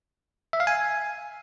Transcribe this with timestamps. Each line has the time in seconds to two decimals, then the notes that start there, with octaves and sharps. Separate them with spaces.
0.53 E5
0.60 F5
0.67 G#5